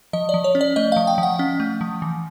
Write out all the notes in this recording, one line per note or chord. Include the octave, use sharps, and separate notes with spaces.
F3 D#5
D5
F3
C#5
C#4
D5
A3 D#5
F5
F3
G5
F3
F#5
C#4
A3
F3
E3